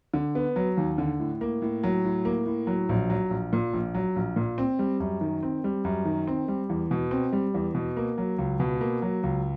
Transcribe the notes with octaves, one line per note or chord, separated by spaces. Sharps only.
D3
B3
F#3
D#2
D3
A2
A#3
A2
F#3
A2
A#3
A2
F#3
A#1
F#3
A#1
A#2
A#1
F#3
A#1
A#2
C4
G3
F#2
D#3
C4
G3
F#2
D#3
C4
G3
E2
B2
C4
G3
E2
B2
A#3
F#3
C#2
B2
A#3
F#3
C#2